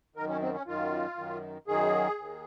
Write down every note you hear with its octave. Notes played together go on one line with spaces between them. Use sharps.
F#2 D#3 A#4
C#4
C4
C#4
F#2 D#3 F4
F#2 D#3
F#2 D#3 G#4
D#2 D#3